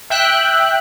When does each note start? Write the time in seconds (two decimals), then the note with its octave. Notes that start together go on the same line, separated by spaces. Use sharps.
0.10 E5 G5 F#6